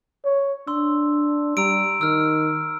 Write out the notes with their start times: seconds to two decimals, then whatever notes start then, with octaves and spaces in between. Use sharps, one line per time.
0.25 C#5
0.67 D4 C6 E6
1.57 G3 A#5 E6 D7
2.01 D#3 E6 F6